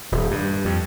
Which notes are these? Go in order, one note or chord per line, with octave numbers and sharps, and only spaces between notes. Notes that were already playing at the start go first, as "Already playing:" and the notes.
D#1
G2
F2